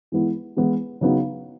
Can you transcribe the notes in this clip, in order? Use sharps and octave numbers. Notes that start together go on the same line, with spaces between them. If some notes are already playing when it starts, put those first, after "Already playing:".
E3 G#3 B3 E4
E3 G#3 B3 E4
C#3 F#3 B3 D#4